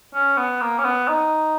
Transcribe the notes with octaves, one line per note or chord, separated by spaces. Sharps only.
C#4
B3
A#3
C#4
B3
D#4